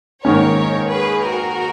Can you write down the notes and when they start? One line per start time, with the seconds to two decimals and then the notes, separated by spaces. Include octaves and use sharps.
0.25 G#2 D#3 A#3 C#4 A#4 C#5
0.91 G#4 B4
1.24 F#4 A#4